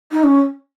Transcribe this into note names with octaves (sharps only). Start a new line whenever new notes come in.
D#4
C#4